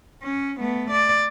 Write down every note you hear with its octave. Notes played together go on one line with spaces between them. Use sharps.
C#4
A3 B3
D5